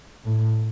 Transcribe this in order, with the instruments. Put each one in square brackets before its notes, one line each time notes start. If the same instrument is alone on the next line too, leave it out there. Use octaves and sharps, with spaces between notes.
[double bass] A2